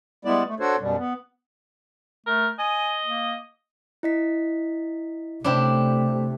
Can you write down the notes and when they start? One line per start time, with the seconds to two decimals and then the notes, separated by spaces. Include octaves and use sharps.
0.25 G3 G#3 B3 E4 D5
0.46 A3
0.60 D4 F#4 A4 C5 C#5
0.80 F#2 B2 G3
0.97 B3
2.26 A3 A#4
2.59 D#5 G#5
3.05 A#3
4.03 E4 D#5 B6
5.44 C3 A3 D4 E4 G4 C5